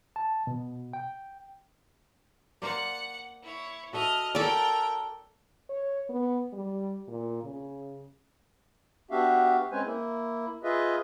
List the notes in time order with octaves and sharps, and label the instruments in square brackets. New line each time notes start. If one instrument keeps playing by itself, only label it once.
[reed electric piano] A5
B2
G5
[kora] A#3 C5 D5 [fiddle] F#5
[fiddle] E4 C#5
[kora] F#4 A4 E5 [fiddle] D#5 F6
[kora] C#4 [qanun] A4 D5 [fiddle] A#4 G5
[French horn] C#5
B3
G3
A#2
C#3
[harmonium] B3 D4 F#4 G4 E5 F5
G#3 C4 C#4 B4 C5 G#5
A#3 E4
F4 G#4 B4 D#5 E5